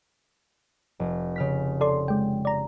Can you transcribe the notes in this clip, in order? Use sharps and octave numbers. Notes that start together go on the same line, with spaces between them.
F1
C#3 F6 B6
A4 D5 C6
G#3 G5
D5 A#5